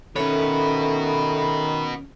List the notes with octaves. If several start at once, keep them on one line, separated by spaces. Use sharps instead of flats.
D#3 C#4 F#4 A4 B4 C#5 E5 B5